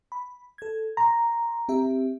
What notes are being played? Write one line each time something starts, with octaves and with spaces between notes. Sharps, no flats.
B5
A4 G#6
A#5 C6
C4 G4 E5